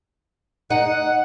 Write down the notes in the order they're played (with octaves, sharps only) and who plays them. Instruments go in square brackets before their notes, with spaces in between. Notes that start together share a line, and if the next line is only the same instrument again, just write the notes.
[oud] D#4 [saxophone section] F#5